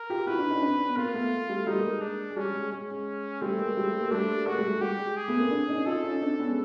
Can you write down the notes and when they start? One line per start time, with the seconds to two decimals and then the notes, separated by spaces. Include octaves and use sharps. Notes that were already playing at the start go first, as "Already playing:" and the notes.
Already playing: A#4
0.10 F4 G4
0.27 E4 F#4 B4
0.39 D4 E4
0.50 C#4 D#4
0.62 C4 D4
0.89 B3
0.97 A#3 C4 F4
1.14 A3 B3
1.49 G3 A3
1.67 G3 A3 D#4
1.79 G#3 A#3
1.90 G#3
2.01 D4
2.30 G#3
2.36 G3 C#4
2.54 G#3
2.72 G#3 C#4
2.90 G#3
3.41 G3 A3 C4
3.59 G#3 A#3
3.77 G3 A3
4.00 A#3
4.11 G3 A3 D4
4.47 G#3 A#3 F#4
4.59 G3 A3
4.70 G#3
4.81 G3 G4
4.99 G#3
5.17 G#4
5.28 A3 B3
5.40 A#3 C4
5.51 C4 D4
5.69 C#4 D#4
5.86 D#4 F4 A4
6.04 C#4 D#4
6.22 C4 D4
6.39 B3 C#4
6.49 G#3